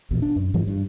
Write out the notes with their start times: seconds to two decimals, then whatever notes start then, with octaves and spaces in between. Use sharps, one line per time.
0.11 A#1 E2 B2
0.22 D4
0.36 F#2
0.54 G#2 E3 F3 G3
0.67 G2